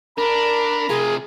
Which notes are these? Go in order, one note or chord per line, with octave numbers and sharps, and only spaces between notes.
D4 A#4 A#5 B5
C3 F4 G#4